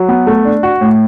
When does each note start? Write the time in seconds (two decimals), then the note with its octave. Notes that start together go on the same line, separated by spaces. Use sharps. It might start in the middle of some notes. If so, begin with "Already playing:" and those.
Already playing: F#3
0.08 B3
0.27 A3
0.45 D4
0.63 F#4
0.81 A2